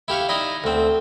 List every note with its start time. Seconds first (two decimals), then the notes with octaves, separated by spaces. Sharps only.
0.08 E4 G4 F5 C#6
0.29 D#4 E4 D5 D#5
0.64 D2 C4